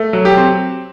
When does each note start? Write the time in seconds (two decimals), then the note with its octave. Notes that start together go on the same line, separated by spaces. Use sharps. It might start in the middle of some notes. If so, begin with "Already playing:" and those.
Already playing: A3
0.13 F#3
0.25 G4
0.37 C4